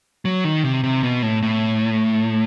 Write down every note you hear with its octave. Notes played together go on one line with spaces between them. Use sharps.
F#3
D#3
C3
C3
B2
A2
A2